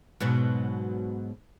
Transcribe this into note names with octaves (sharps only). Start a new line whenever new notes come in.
G#2 B2 F#3